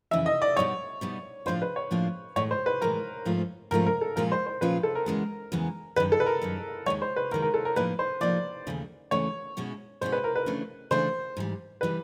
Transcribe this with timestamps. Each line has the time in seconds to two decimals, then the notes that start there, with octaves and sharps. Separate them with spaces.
0.11 F2 C#3 E3 E5
0.26 D#5
0.42 D5
0.56 B2 G3 B3 D#4 C#5
1.01 B2 G3 B3 D#4
1.46 A2 F3 A#3 D4 F4 C5
1.62 B4
1.76 C#5
1.91 A2 F3 A#3 D4 F4
2.36 A2 E3 G#3 C#5
2.51 C5
2.66 B4
2.81 A2 E3 G#3 A#4
3.25 G#2 F3 A3 C#4 F4
3.71 G#2 F3 A3 C#4 F4 A#4
3.86 A#4
4.01 A4
4.16 A#2 F3 G#3 C#4 F4 A#4
4.32 C5
4.46 C5
4.61 A#2 F3 G#3 C#4 F4 B4
4.83 A4
4.95 A#4
5.06 E2 C#3 E3 G#3 B3
5.52 E2 C#3 E3 G#3 B3
5.96 F#2 D#3 G3 B4
6.12 A4
6.20 B4
6.26 A#4
6.42 F#2 D#3 G3
6.86 D#2 D#3 G#3 C#5
7.02 C5
7.16 B4
7.31 D#2 D#3 G#3 A#4
7.42 A#4
7.54 A4
7.65 A#4
7.76 A2 F3 A#3 D#4 B4
7.99 C5
8.21 A2 F3 A#3 D#4 D5
8.67 D#2 C#3 E3 A3
9.11 D#2 C#3 E3 A3 C#5
9.57 B2 G#3 C#4 E4
10.01 B2 G#3 C#4 E4 C5
10.12 B4
10.24 A#4
10.36 B4
10.46 C#3 E3 A3 D4
10.91 C#3 E3 A3 D4 C5
11.37 G#2 E3 G3
11.81 E3 G3 B4